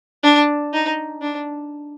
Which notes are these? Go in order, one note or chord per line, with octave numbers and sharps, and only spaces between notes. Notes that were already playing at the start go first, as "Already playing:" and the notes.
D4
D#4
D4